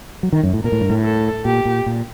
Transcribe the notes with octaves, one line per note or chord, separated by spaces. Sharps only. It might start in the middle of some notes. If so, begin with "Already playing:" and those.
F#3
D#3
F#2
A2
A#2 A#4
A2
G2
A2
A4
A#2 G4
A#2
A#2